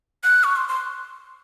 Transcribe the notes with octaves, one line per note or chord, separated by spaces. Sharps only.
F#6
C#6
C6
C6